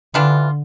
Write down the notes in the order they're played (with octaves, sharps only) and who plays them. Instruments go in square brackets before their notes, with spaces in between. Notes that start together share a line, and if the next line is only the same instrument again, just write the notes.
[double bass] D3 [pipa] E3 G3 D4 F4